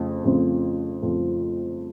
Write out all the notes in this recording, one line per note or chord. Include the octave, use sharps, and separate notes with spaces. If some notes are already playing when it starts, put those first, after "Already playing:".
Already playing: F2 C#3 A3 C4 F4
F2 C#3 A3 C4 F4
F2 C#3 A3 C4 F4